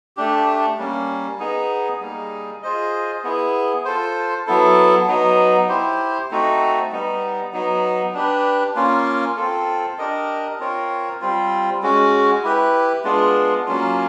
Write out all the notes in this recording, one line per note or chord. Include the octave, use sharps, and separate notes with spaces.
A3 D4 G4
G3 A#3 C#4
B3 D#4 G#4
G3 A#3 D#4 G#4
F4 G#4 C5 D#5
B3 E4 G#4
F4 A4 C5
F#3 B3 E4 A4
F#3 B3 D#4
E4 G4 C5
A3 C4 D#4 F#4
G3 B3 D#4
F#3 B3 D#4
D4 G4 B4
A#3 C#4 F4
C4 F4 A4
D4 G4 A#4 D#5
C4 F4 A#4 C#5
G3 C4 F4
G#3 C#4 F#4
E4 G4 B4
G#3 B3 D4 F4
F#3 A#3 C#4 F4